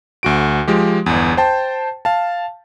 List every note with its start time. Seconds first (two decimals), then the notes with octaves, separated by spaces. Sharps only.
0.23 D2 F#4 D7
0.68 F3 G#3 G4
1.06 G1 E2
1.37 C5 G5 A5
2.05 F5 A5